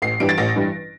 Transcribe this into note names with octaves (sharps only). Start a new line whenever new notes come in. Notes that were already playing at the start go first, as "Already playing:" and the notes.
A1 C7
G2 E3 G3 D7
A6
A1 A#6
G2 E3 G3